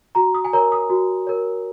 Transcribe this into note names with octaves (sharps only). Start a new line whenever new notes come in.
F#4 A#5
D#6
G#5
A#4 C#5 A#5
D#6
F#4
A#4 C#5